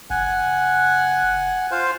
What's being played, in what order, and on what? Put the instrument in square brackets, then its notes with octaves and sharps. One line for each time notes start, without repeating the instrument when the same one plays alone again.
[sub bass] F#1 [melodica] F#5 G#5
[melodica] F4 C5 F5